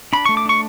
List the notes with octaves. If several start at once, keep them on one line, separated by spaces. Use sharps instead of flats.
D4 B5
A3 C#6
D6
D4 C#6